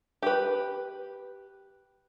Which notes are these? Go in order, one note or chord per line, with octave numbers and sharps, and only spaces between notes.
G4 B4